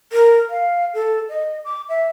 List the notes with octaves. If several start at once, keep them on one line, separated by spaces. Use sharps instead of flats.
A#4
F5
A4
D#5
D6
E5